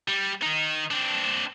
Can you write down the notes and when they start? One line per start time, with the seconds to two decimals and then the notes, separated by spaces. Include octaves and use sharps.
0.08 G3
0.43 D#3 D#4
0.91 C4 D4